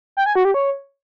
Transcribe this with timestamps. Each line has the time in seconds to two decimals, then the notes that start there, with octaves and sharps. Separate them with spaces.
0.17 G5
0.26 G#5
0.36 F#4
0.45 G4
0.54 C#5